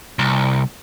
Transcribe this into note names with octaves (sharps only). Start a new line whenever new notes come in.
C2